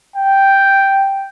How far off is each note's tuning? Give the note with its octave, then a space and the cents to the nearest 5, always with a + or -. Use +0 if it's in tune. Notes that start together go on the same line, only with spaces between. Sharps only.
G5 +0